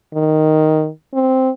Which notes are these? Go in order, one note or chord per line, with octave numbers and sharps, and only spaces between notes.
D#3
C4